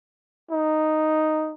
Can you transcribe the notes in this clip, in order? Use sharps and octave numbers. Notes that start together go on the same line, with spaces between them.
D#4